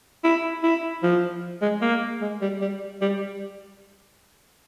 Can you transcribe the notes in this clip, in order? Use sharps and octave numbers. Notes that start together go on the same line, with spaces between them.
E4
E4
F3
G#3
A#3
G#3
G3
G3
G3